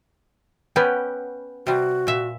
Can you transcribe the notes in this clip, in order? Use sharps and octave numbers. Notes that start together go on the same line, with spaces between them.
B3 C#4 B4 G5
C3 G3 F#4
A#2 E5